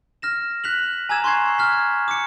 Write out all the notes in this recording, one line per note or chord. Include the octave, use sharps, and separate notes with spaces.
F6 A#6 E7
F#6 B6 F7 F#7
G#5 A#5 D6 E6 G#6 E7
C6 C#6 F#6 G#6 C7
F6 G#6 B6
D6 C#7